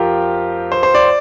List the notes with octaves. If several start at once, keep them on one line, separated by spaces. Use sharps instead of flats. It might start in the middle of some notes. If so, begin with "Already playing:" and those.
Already playing: F2 F3 F4 G4 A#4
C5
C5
D5